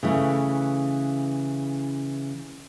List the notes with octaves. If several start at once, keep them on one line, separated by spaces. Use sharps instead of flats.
C#3 E3 A3